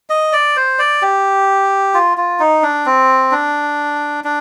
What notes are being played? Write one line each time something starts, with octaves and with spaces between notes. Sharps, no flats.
D#5
D5
C5
D5
G4
F4
F4
D#4
D4
C4
D4
D4